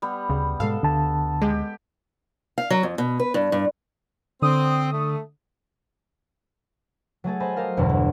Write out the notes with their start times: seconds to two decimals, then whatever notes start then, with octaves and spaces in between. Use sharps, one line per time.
0.02 G3 B3
0.30 D2 C#3
0.60 G#2 B2 G#3 A4 F5
0.83 D2 D3 A5
1.42 G#3 G4
2.58 F5
2.70 F#3
2.83 F2
2.98 B2
3.20 B4
3.34 G2
3.52 G2
4.42 D3 C4 D#6
4.93 A3
7.24 F#3 A3 G#4 A4
7.40 C5 D#5 G#5 A5 B5
7.56 G4 A4 A#4 D#5 F5
7.77 G1 E2 B2 D3 E3 F#3
7.89 G1